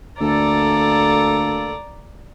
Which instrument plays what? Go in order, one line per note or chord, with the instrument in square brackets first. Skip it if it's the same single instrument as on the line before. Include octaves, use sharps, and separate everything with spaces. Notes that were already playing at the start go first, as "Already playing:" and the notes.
[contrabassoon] D2 [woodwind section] A#3 A4 [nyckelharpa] D5 A#5